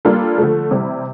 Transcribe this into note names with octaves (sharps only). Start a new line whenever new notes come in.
G3 A#3 D4 F4 A4
D3 F3 A3
C3 E3 G3 C4 E4